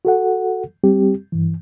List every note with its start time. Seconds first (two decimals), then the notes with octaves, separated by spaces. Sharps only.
0.05 F#4 A4 F#5
0.84 G3 C4 G4
1.32 G2 E3